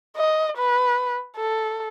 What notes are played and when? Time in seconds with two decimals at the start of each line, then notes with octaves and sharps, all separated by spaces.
0.17 D#5
0.57 B4
1.36 A4